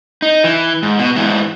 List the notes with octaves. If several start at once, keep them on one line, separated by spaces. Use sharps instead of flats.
D#4
E3
G#2
B2
G#2 E3